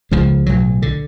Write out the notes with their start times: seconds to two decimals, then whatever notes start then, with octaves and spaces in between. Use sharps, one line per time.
0.11 C#2 C#3 F3 G#3
0.46 B1 A2 F#3
0.82 D3